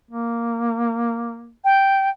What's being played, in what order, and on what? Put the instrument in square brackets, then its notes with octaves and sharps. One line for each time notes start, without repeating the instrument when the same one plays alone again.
[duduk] A#3
[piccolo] G5